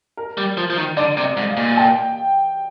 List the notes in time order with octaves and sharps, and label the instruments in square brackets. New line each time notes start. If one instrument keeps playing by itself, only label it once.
[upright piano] A#4
[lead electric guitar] G3
F3
F3
D#3
[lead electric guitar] D3 [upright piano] D5
[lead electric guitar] C3
[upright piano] D#5
[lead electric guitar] G#2
[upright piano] F5
[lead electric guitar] A#2
[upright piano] G5